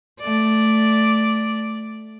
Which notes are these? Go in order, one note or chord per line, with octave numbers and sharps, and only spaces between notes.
A3 D5